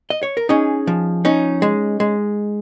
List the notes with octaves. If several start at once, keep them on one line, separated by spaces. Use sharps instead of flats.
D#5
C#5
A#4
C#4 D#4 G#4
F3
C#4 D#4
G#3
G#3